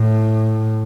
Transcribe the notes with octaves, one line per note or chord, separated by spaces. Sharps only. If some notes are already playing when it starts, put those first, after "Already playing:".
Already playing: A2